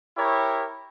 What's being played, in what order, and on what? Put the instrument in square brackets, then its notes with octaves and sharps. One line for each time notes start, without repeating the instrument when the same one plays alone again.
[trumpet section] E4 G4 A#4 C#5